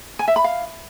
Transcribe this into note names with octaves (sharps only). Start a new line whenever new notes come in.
G#5
E5
B5
F5